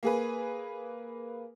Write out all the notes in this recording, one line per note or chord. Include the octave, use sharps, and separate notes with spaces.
A#3 G#4 B4